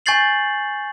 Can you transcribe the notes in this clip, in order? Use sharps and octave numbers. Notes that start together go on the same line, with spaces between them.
G#5 C#6 G6 A6 C7 F#7